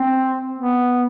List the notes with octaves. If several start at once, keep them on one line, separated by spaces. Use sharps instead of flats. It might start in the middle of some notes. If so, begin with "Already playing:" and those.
Already playing: C4
B3